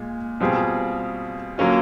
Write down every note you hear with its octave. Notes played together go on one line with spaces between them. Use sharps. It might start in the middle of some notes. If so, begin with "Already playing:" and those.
Already playing: A#2 G#3
B2 G3 C4 F4 G#4
D3 F#3 A#3 C#4 F4